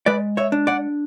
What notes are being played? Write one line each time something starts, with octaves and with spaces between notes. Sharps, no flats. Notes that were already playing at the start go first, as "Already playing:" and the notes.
G#3 B4 D5
C#5 E5
D4
D5 F#5